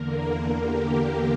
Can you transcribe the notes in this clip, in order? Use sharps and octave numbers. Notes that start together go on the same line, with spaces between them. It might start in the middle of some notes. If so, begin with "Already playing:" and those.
Already playing: E2 D3 A#3 A#4
G4